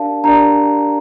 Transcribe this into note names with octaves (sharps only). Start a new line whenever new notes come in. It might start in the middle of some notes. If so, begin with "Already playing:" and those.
Already playing: D4 G4 A#4 D5 F5 A5
D4 G4 A#4 D5 A#5